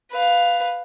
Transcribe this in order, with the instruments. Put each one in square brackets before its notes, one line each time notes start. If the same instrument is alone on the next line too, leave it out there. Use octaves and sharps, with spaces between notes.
[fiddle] B4 F5